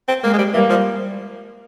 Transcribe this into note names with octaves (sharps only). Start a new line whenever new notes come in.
C4
G#3 A#3
G#3
G3
E3 G3 A#3
F3